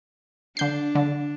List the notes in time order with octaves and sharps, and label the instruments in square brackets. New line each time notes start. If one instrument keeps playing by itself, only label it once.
[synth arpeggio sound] D3 G6 C7 [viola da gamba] D4
[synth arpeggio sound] D3